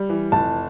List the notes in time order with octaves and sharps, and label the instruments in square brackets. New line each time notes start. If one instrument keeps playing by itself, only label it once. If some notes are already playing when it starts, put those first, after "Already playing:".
Already playing: [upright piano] G3
E3
[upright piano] F1 [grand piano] A5